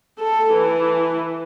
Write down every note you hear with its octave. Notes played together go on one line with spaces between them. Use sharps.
A4
E3